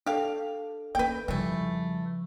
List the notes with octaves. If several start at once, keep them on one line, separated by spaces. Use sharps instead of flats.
D4 G4 A4 F5
A#3 C#4 B4 G5
F2 C#3 E3 F3 G3 A3